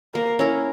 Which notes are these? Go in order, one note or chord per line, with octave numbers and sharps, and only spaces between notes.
A#3 A#4
C#4 E4 A#4